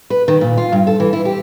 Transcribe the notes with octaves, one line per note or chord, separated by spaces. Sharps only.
B4
D#3
A#2
F4
G2
A4
E3
E4
G4